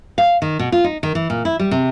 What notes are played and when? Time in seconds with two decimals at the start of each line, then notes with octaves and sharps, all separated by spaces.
0.18 F5
0.42 D#3
0.59 B2
0.72 F4
0.84 D#4
1.03 D#3
1.15 E3
1.30 A#2
1.45 E4
1.59 G3
1.71 C3